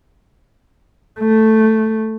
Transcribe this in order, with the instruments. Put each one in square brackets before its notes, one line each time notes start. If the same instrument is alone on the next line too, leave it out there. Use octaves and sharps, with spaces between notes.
[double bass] A3